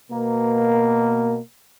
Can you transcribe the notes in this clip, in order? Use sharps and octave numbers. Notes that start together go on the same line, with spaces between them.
B2 A#3